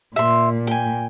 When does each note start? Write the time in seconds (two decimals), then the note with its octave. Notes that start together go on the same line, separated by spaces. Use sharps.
0.16 A#2 E5 C6
0.67 G5 G#5